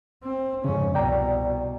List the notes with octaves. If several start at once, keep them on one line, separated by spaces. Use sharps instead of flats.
C4
F2 G#2 C#3 C#4
C2 B2 D5 G5 A#5
B2